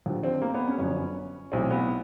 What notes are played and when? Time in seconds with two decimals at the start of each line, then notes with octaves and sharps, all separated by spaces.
0.06 D#2 D3 F3
0.24 C4
0.42 A#3
0.55 B3
0.67 C#4
0.78 G1 F#2 D3 F3 C#4
1.52 B1 A2 E3 C4
1.71 B3